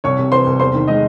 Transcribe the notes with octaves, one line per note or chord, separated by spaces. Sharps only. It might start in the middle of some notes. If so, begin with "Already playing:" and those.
C2 C#5 C#6
C3
E3 C5 C6
C2
E2 C5 C6
D#3
G#3 D#4 D#5